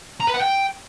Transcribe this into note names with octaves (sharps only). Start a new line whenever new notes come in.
A#5
B4
F#5
G5